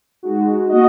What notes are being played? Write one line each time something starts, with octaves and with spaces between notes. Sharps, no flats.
G#3 D#4 F#4
A#3 F#4 D#5